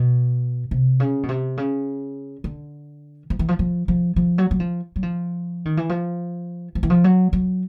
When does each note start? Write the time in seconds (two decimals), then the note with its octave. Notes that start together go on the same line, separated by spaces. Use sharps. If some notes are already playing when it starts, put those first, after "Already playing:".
Already playing: B2
0.71 C3
1.00 C#3
1.23 B2
1.29 C3
1.57 C#3
2.44 D3
3.30 F3
3.39 E3
3.48 F3
3.59 F3
3.88 F3
4.16 F3
4.38 F#3
4.51 F#3
4.60 F3
4.96 F#3
5.03 F3
5.65 D#3
5.77 E3
5.89 F3
6.75 F3
6.83 E3
6.90 F3
7.04 F#3
7.33 F#3